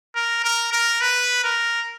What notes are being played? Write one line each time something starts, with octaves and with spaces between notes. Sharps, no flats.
A#4
A#4
A#4
B4
A#4